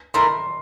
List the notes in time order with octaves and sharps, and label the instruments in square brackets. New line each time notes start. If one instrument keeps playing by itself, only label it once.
[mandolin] A3 E4 A#4 [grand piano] C6